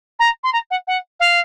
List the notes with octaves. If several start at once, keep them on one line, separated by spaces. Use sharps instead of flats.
A#5
C6
A#5
F#5
F#5
F5